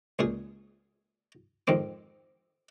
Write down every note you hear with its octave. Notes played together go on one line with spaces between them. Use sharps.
C#2 A#2 G#4
F2 G#2 D#3 C4 D6